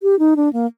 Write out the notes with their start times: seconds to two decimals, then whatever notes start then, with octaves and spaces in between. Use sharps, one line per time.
0.02 G4
0.19 D#4
0.36 D4
0.53 A#3